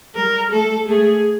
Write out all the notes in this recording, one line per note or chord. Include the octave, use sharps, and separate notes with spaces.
G3 A#4
A3 A4
A3 G#4